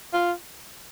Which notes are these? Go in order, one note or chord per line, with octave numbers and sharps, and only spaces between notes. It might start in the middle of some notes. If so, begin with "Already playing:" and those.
F4